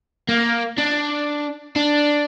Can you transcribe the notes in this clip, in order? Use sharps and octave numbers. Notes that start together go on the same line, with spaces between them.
A#3
D4
D4